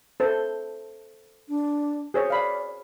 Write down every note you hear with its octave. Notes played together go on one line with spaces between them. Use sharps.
A4 C5
D4
G#4 C5 C#5
D5 F5 B5